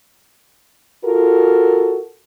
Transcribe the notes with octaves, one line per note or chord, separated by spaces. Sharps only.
F4 F#4 A4 A#4